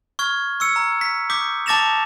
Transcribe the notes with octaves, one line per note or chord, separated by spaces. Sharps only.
C#6 F6 G#6
C#6 E6 C#7
A#5
B6
D6 D#6 G6 B6
A5 D6 A6 A#6 E7 F7